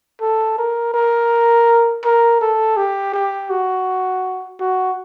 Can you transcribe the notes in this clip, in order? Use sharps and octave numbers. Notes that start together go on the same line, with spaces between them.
A4
A#4
A#4
A#4
A4
G4
G4
F#4
F#4